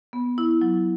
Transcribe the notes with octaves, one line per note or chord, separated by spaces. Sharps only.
B3
E4
F#3